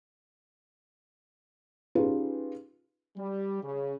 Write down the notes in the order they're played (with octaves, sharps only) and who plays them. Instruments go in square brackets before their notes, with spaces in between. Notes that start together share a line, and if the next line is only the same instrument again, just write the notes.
[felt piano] C#4 D#4 F4 G4 G#4 B4
[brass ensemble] G3
C#3